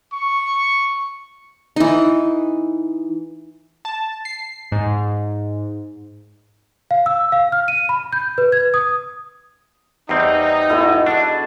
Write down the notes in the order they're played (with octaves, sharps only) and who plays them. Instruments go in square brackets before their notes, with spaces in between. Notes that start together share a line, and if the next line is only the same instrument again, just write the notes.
[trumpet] C#6
[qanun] E3 D#4
[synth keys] A5
C7
G#2
[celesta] F5
E6
F5
F6
D#7
B5
G6
B4
G#6
D#6
[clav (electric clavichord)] E2 C4 [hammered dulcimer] G3 D5 C6 [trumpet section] D#4
[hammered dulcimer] G#2 B2 F#4 [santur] E4 A4
[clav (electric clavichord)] D4 [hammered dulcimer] G#4 F#5 A5